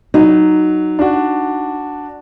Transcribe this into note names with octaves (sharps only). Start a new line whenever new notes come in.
F#3 D#4
D4 F#4